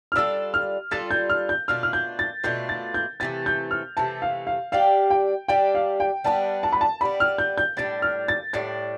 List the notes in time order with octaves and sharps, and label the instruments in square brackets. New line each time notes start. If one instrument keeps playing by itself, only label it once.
[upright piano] F6
[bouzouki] G3 D4 F4 A4 [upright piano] E6
[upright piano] F6
[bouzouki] G3 D4 F4 A4 [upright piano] A6
[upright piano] G6
F6
G6
[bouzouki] B2 A3 D4 F4 [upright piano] F6
[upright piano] F6
G6
A6
[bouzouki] B2 A3 D4 F4 [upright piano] G6
[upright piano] A6
G6
[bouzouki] C3 E3 A3 [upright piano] A6
[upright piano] G6
F6
[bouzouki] C3 E3 A3 [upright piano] A5
[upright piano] F5
F5
[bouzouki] G3 D4 G4 [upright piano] F5
[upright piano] G5
[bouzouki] G3 D4 G4 [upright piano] G5
[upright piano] F5
G5
[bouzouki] G3 B3 D4 [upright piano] A5
[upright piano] A5
B5
A5
[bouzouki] G3 B3 D4 [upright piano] B5
[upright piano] F6
G6
G6
[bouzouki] A2 G3 D4 [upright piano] A6
[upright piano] F6
A6
[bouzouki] A2 G3 D4 [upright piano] A6